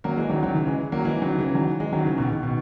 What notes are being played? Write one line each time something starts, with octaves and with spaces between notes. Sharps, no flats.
F#3 A#3
E3 G#3
D#3 F#3
D#3 F#3
C#3 E3
E3 G#3
F#3 A#3
E3 G#3
D#3 F#3
C#3 E3
D#3 F#3
E3 G#3
D#3 F#3
C#3 E3
B2 D#3
B2
B2 D#3